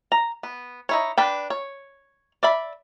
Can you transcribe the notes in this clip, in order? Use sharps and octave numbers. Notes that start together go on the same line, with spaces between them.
A#5
B3
D#4 E4 C#5
D4 B4 G5
C#5
D5 E5 B5